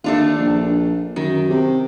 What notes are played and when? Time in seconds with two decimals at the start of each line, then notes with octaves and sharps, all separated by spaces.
0.04 D#2 A3 D4 F4
0.39 A#1
1.16 F#2 D#3
1.50 C3